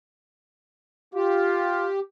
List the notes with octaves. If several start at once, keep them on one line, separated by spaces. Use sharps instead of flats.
F4 G4